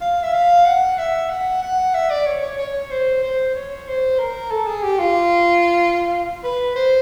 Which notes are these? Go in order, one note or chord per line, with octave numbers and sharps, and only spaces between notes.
F5
E5
F5
F#5
E5
F#5
F#5
E5
D5
C#5
C#5
C#5
C5
C5
C#5
C5
A#4
A4
G#4
G4
F4
B4
C5